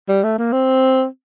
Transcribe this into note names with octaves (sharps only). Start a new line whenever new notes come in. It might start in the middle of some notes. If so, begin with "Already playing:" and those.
G3
A3
A#3
C4